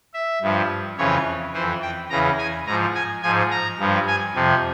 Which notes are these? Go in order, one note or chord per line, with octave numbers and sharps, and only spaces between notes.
E5
G2 F3
F2 C#3 E3 C#5
F2 E3 C5
G5
E2 C#3 E3 A#5
G#5
G#2 F3 A#5
G#5
G#2 F3 G#5
A#5
G2 F3
G#5
F2 C3 F3